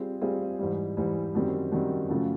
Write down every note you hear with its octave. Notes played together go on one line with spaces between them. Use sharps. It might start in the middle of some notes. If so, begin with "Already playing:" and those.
Already playing: G3 C4 F4 G#4 C5
G3 C4 F4 G#4 C5
G#2 E3 G3
G#2 E3 G3
F#2 D#3 G3 C4
F#2 D#3 G3 C4
F#2 C#3 F3 A3